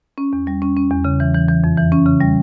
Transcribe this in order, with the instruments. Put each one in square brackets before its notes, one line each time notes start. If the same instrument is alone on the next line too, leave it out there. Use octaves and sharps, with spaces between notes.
[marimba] C#4
E2
G3
C#4
C#4
E2
C#3
E3
E3
E3
F2
E3
C#4
C#3
G3